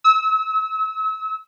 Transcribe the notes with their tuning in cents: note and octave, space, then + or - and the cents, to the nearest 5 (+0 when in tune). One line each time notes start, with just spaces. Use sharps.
E6 -40